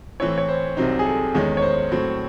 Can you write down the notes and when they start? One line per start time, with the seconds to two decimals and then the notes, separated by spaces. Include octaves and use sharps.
0.20 A2 E3 C4 E4 C#5
0.38 C#5
0.48 C5
0.77 C2 C3 F#3 C4 D#4
0.99 G#4
1.05 A4
1.35 E2 D#3 G#3 C#4
1.57 C#5
1.62 C5
1.92 A2 F#3 C4